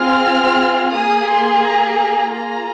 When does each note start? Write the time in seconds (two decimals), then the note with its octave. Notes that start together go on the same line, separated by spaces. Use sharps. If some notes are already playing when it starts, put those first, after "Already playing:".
Already playing: C4 F4 G#4 F6
0.93 A#3 G#4 D#6
1.29 C6
1.63 A#5
1.97 A#5
2.32 A#3 F4 G#4 A#5